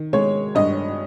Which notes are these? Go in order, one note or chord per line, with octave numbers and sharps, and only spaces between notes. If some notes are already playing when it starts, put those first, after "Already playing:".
Already playing: D#3
G#3 C#5
G2 D#5